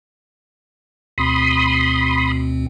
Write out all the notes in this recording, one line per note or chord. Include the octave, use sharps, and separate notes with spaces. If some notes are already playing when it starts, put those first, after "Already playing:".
D2 B2 C4 B5 C6 D#6